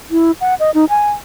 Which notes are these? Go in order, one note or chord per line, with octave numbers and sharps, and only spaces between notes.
E4
F#5
D#5
D#4
G#5